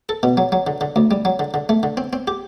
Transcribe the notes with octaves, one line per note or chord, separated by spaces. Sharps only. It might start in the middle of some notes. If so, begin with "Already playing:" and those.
A4
B2
F#3
F#3
D3
D3
D2
G3
F#3
D3
D3
A3
D3
C4
C4
G4